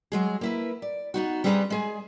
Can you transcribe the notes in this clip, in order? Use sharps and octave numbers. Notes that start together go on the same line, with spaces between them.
F#3 G#3 G#4
A#3 E4 B4
D5
B3 D#4 F#4
G3 C4 G#4 B4 A5 A#5
G#3 G#4 G#5